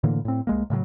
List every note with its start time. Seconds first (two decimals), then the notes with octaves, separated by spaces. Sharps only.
0.04 A2 D3 E3 A#3
0.25 A2 C4
0.47 C2 G#3 A#3
0.70 A2 C#3 E3 F#3